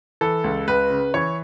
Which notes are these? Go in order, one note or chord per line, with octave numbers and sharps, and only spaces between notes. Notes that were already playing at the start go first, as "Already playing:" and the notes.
E3 A4
C#2
C#2 B4
C#3
E3 C#5